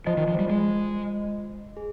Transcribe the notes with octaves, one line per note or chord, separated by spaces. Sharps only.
F3 F4 C5 D#5
D#3
F3
G3
G#3
G#4